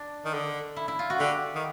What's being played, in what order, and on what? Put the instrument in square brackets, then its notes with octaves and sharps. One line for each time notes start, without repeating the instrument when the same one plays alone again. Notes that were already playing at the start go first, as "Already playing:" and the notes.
Already playing: [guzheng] D4
[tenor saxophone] D#3
D3
[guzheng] E4
E4
F4
F#4
[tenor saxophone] D3 [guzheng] G4
[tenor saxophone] D#3